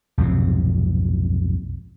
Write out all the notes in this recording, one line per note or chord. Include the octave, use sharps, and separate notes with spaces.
B1 F2 G#2 C3